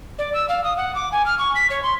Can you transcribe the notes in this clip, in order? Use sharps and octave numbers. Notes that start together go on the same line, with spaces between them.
D5
E6
F5
D#6
F#5
D6
G#5
F6
C#6
B6
C#5
C6